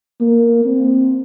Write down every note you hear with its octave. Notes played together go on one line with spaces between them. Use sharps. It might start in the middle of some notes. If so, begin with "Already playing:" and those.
A#3
C4